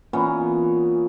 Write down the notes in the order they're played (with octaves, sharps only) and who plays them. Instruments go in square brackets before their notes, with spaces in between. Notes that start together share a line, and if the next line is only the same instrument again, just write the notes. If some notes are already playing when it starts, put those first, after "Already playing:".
[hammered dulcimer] A#2 E3 B3 C#4